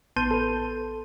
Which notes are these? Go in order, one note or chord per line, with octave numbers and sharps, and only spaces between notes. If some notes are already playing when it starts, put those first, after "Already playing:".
A1 B3 A5 C6 G6 D#7
A4 B4